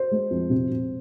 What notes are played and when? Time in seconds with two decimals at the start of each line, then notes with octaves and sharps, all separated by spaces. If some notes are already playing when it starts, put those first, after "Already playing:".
Already playing: C5
0.11 G#3
0.30 F2
0.50 C3
0.70 C3